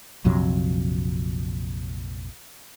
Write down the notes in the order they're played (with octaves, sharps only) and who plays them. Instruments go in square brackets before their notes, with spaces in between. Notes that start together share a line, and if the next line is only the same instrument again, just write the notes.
[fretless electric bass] A#1 F2 C3 F#3